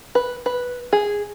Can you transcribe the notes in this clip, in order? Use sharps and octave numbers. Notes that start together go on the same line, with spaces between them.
B4
B4
G#4